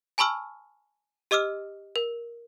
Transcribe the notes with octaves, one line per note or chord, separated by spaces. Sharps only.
G#5 A5 B5 C#6 E6 F6
G4 D#5 D6 E6 F6
A#4